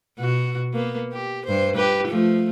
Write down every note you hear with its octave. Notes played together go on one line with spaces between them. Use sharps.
B2 F#4
A#3 B3
G4
G2 C5
G4 B4
F3 A3